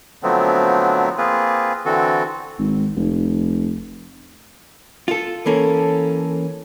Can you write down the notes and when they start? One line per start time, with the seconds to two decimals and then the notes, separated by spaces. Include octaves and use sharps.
0.23 D3 F3 F#3 A3 B3 C4
1.18 A#3 C4 F4 G#4 B4
1.85 D3 E3 C4 F#4 A4
2.58 G#1
2.96 F1
5.08 F4 A4
5.46 E3 A#3 C#4 A4